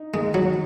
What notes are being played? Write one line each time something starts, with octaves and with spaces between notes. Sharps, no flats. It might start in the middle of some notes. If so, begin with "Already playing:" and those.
Already playing: D#4
D#3 G#3
F#3